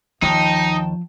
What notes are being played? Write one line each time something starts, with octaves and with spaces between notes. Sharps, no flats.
D#2 F3 D#4 G5 A5